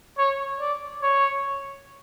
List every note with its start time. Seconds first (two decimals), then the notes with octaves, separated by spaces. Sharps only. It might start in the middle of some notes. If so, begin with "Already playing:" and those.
0.18 C#5
0.60 D5
1.02 C#5